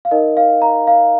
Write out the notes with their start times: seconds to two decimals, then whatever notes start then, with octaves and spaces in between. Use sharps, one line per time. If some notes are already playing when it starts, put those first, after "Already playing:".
0.05 F5
0.11 D#4 A#4 D#5
0.37 F5
0.62 A#5
0.87 F5